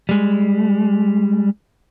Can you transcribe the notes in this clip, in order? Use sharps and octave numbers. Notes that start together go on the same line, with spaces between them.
G3 G#3